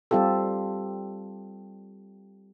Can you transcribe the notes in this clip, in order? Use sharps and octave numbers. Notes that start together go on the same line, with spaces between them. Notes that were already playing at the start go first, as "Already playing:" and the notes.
G3 C4 F4 G4 A4